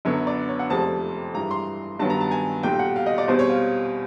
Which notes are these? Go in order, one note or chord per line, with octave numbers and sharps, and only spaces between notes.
F#2 D3 F#3 B3 C#5
D5
C#5
F#5
F1 F2 C3 F3 G#3 A5
G2 E3 G#3 A#5
C6
G2 D#3 F#3 B3 A5
A#5
A5
G#5
B1 A#2 G3 G5
F#5
F5
D#5
D5
E2 B2 G3 C4 C5
C#5
F5